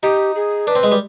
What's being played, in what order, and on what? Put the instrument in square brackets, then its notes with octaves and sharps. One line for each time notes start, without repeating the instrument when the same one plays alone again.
[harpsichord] D#4 [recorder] G4
[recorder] G#4
[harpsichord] D4 [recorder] B4
[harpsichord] C4
G#3
G3